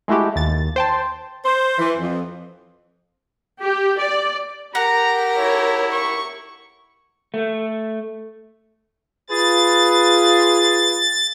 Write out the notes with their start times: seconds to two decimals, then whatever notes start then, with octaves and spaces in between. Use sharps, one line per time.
0.08 G#3 A3 E4 F#4 G4
0.36 D#2 A6
0.76 C5 G5 A5
1.45 C5
1.79 E3
1.98 F2
3.61 G4
3.99 D5
4.75 G4 A4 A#4 F#5 A#5
5.38 E4 C#5
5.92 C#6
7.34 A3
9.30 F4 G#4 B4 A6